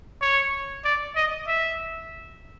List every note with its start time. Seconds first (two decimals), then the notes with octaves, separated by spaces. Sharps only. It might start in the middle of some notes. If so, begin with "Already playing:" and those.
0.22 C#5
0.85 D5
1.16 D#5
1.48 E5